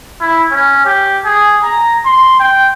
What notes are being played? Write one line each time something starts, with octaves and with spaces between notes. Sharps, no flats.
E4
C#4
G4
G#4
A#5
C6
G5